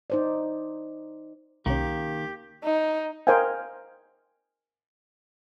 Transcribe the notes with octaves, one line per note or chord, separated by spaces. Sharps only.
D#4 C5 D5
C2 D#3 A#3 C#4 G4
D#4
A#4 C5 D#5 F5 G5 G#5